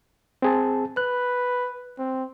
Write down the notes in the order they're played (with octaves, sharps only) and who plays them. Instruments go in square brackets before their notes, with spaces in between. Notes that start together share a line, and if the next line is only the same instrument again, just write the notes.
[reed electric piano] C4 G#4 A5
[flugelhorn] B4 [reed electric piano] F#6
[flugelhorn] C4